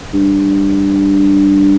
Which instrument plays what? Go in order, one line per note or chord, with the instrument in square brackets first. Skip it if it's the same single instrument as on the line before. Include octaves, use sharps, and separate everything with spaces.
[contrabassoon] G2